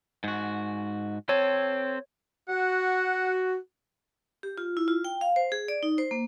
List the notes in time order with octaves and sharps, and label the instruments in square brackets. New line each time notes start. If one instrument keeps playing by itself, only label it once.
[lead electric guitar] G#2 F#4
[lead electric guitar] C4 A4 [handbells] C#5
[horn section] F#4 [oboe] F#5
[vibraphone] G4
F4
E4
F4
G5
F5
C5
G#4
D5
D#4
C5
A#3